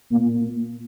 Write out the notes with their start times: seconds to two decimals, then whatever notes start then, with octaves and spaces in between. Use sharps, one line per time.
0.10 A#2